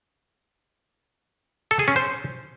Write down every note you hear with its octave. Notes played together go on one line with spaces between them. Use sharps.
A4
G#4
C#4
C5